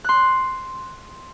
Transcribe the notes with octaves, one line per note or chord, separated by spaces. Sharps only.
C6 F#6